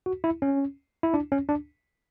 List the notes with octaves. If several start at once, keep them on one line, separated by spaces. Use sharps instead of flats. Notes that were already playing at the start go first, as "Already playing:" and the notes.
F#4
E4
C#4
E4
D4
C#4
D4